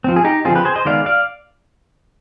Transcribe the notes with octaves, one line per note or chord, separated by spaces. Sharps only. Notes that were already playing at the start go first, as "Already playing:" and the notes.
F3 C4
G#4
D#4 G4
D3 F3 C4 F4 G#4
G4 B4
G#4 C5
C5 D#5
D#3 G#3 B3 D5 F5
D5 F5